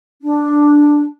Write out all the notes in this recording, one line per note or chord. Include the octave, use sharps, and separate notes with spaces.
D4